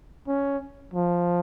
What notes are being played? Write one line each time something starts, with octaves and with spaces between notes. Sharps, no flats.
C#4
F3